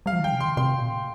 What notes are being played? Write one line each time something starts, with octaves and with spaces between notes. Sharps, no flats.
G3 F5
F3
D#3 G5
C3
D#3 C6
C3 C6
A#2